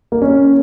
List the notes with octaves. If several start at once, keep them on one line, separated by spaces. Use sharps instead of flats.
A#3
C#4